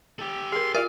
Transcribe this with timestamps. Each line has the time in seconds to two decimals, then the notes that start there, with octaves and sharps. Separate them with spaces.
0.19 G4 A4
0.52 G#4 A#4 C6
0.75 F4 A#4 D5 E5 F5